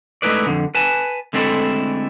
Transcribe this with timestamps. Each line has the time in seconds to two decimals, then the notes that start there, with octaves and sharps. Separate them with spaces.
0.22 G#3 A3 D#4 E4 B4 D5
0.47 F2 D3
0.75 B4 G#5 A5
1.33 D3 G#3 A3 C4 E4 A4